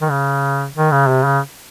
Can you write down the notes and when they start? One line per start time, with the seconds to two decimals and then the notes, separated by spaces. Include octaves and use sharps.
0.02 D#3
0.10 C#3
0.75 D#3
0.92 C#3
1.08 C3
1.25 C#3